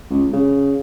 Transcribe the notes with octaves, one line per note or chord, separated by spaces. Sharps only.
C#2
C#3